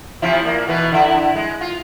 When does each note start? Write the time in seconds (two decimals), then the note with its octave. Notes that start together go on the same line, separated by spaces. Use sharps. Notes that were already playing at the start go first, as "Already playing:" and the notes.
0.22 C3 F3 E4
0.42 A#2 A#3
0.67 B2 E3 B4
0.92 D3 E4
1.36 G#3
1.61 F4